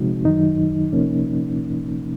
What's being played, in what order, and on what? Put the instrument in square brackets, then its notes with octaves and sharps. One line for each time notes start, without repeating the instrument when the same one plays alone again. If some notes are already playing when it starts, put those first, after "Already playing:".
Already playing: [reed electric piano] C3 F3 G#3 C4 D#4 F#4
F#2 D#3 F#3 D#4
C3 F3 A#3 C#4